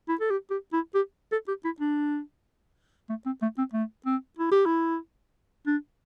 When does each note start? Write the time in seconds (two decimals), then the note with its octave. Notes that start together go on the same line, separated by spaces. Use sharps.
0.09 E4
0.20 A4
0.30 G4
0.51 G4
0.73 E4
0.95 G4
1.32 A4
1.48 G4
1.65 E4
1.80 D4
3.09 A3
3.26 C4
3.42 A3
3.58 C4
3.73 A3
4.06 C4
4.39 E4
4.51 G4
4.66 E4
5.67 D4